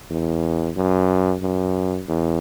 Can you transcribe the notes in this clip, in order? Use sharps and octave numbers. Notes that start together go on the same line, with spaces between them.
E2
F#2
F#2
E2